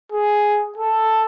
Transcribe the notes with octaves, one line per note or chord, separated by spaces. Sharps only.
G#4
A4